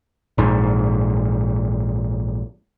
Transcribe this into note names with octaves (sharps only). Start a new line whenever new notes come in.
A#1 G#2